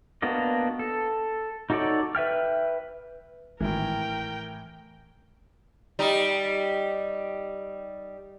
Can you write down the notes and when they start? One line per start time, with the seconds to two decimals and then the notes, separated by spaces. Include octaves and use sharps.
0.22 A#3 B3 D4 F#4 D#5
0.79 A4
1.70 D#4 F#4 A4 C#5 D5
2.15 B4 E5 G5 F6
3.60 G#1 A2 E3 A#4 G5
5.99 G3 D#4